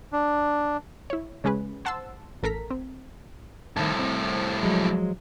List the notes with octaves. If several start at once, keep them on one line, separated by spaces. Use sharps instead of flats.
D4
E4 C#5
C#3 G#3 C#4 G#4 B4
C5 F#5 A5 C6 E6
A1 A4 A#4 A#5 B6
C4
C2 A2 D#3 A5
C4
F3 F#3 G#3